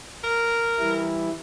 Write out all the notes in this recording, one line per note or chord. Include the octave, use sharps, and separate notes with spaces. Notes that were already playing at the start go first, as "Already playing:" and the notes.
A#4
E3 G3 E4